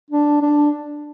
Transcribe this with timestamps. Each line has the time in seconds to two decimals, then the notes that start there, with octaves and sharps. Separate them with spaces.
0.11 D4
0.42 D4